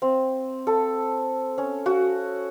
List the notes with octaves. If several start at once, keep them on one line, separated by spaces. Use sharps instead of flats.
C4
A4
C#4
F#4